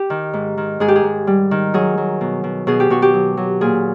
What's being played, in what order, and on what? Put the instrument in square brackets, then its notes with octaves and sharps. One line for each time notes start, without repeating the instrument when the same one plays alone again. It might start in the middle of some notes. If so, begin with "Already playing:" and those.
Already playing: [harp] G4
D#3
G#2
D#3
G#2 G#4
G4
G#4
G#2
G3
D#3
F#3 G#4
F#3
B2
B2
B2 G#4
G4
B2 F#4
G4
F#3
F#3
A#2 G#4